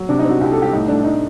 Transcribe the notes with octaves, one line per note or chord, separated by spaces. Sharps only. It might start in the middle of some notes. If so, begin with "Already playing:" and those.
Already playing: F#3
C3 D4
D#4
C4
F#4
C2 G4
A4
G3 G4
A2 D#4
A3 D4
D#4